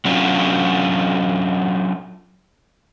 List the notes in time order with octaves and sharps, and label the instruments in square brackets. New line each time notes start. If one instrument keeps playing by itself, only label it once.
[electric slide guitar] F#3 C#4 D4 F4